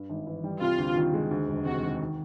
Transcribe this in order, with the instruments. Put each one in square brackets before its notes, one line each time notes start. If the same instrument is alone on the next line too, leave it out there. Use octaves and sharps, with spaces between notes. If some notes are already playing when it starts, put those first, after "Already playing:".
Already playing: [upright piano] G2
G#1
E3
G3
[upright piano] C3 [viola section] F4
[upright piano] D2
D#3
G#3
D2
E1
[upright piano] C3 [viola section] F#4
[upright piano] D#3
D#3